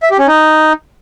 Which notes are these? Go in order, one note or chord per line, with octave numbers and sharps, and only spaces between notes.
E5
G4
C#4
D#4